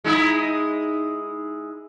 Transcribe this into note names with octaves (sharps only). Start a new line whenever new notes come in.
G#3 D#4 E4